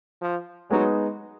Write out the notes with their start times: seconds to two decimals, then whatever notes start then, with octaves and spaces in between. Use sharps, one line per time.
0.21 F3
0.70 F#3 G#3 B3 D#4